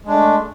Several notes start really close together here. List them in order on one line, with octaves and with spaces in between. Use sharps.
G#3 D4 A3